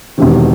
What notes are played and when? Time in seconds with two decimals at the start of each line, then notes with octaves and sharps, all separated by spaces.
0.18 E1 E2 C3 D#3